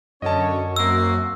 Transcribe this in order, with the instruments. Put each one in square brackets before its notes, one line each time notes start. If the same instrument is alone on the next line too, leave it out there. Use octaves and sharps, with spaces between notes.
[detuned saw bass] F#2 [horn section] D3 C#4 C#5 [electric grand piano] D#5 A5
[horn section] A#3 C4 F#4 [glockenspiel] E6